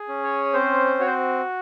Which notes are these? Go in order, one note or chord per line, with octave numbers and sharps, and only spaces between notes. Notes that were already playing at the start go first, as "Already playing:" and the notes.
Already playing: G#4
C#4
C#5
C4 C5
F#4 C#5
C5